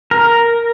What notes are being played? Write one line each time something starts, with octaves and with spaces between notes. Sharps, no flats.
A#4